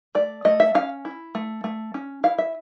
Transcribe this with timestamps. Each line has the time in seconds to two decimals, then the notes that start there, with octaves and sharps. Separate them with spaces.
0.15 A3 D5
0.45 A3 D#5
0.60 E5
0.75 C#4 F5
1.05 E4
1.35 A3
1.64 A3
1.94 C#4
2.24 E4 F5
2.38 E5